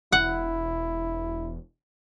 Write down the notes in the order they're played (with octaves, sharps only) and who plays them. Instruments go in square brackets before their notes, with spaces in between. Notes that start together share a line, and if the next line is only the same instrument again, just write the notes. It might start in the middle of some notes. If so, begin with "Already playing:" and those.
[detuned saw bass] E1 [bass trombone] E4 [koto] F#5